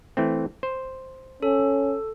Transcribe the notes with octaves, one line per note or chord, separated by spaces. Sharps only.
E3 A3 C4
C5
C#4 A4